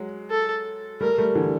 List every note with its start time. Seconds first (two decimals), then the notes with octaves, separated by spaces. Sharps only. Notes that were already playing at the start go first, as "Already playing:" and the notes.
Already playing: F#3 G#3
0.30 A4
1.01 G3 A3 A#4
1.18 G3 A3
1.35 D3 E3